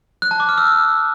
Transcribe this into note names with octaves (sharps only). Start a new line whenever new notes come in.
F#6
A5
D6
F6
E6